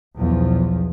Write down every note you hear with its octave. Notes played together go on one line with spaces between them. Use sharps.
B1 E2 F3